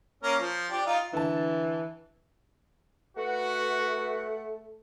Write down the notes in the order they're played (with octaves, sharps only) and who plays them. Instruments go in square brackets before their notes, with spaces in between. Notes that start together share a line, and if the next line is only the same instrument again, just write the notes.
[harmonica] A#3 C#4 A#4
F3
D4 G4
D#4 F4
[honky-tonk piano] D3 A5 [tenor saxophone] E3
[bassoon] A3 [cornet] F#4 [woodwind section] B4 F#5